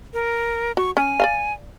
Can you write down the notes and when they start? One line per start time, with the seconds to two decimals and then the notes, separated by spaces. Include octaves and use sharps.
0.14 A#4
0.77 F#4 C#6
0.97 C#4 G#5
1.20 D5 D#5 F5